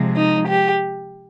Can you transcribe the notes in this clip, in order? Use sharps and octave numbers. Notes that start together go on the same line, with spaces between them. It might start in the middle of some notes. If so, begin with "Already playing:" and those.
Already playing: C3 F3 G#3
D#4
G4